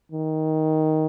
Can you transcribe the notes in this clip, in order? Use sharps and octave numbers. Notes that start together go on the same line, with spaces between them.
D#3